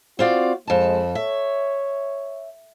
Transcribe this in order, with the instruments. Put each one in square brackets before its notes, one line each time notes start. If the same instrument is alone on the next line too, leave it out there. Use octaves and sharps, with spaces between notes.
[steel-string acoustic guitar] C4 F4 D5 [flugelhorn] F#4
[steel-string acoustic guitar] F2 A5 [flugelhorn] G#3
[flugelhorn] C#5 [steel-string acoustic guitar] E5